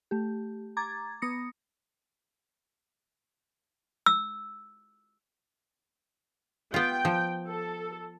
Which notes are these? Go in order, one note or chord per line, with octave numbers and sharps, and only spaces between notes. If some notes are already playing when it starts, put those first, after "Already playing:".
A3 G4
A#5 D6 G#6 A6
B3 D#6 A#6 C#7
E6
B3 F4 G5
F3
A4